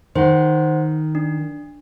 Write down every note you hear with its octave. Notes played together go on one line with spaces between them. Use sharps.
D#3 C5 F#5
D4